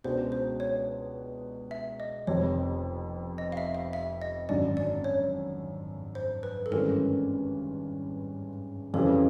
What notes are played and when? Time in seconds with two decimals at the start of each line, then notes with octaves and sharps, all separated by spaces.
0.04 C#2 B2 G#3 B3 D4 C5
0.32 C5
0.60 C#5
1.71 E5
2.00 D#5
2.27 F1 F2 C3 C#5
3.38 D#5
3.52 F5
3.57 E5
3.75 F5
3.93 E5
4.22 D#5
4.49 G#1 F#2 D3 D5
4.77 D5
5.04 C#5
6.15 C5
6.43 B4
6.66 A4
6.71 G#1 G2 E3 G#3 C#4 A#4
8.94 F2 C#3 E3 G3 A4